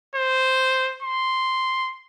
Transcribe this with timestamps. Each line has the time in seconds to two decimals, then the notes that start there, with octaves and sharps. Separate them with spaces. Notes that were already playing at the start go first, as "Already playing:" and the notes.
0.16 C5
1.02 C6